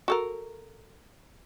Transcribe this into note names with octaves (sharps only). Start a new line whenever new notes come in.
F#4 A4 A#4